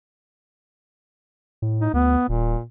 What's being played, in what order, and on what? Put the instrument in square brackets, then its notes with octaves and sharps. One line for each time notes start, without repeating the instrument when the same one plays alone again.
[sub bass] A2
[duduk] D#4
[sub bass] D2 [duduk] B3
[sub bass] D#1 [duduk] A#2